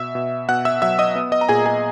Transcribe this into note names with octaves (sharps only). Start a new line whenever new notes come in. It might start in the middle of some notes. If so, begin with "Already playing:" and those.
Already playing: B2 E5 E6
B2
B2 F#5 F#6
E5 E6
F#3 E5 E6
D#5 D#6
B3
D#5 D#6
A#5
A#2 G#4 G#5
G#4 G#5